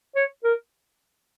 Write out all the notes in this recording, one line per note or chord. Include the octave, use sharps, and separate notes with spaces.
C#5
A#4